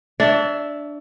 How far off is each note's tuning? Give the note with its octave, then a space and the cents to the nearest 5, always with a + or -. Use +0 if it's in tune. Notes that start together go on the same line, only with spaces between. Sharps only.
D4 +0 C#5 +40 E5 +0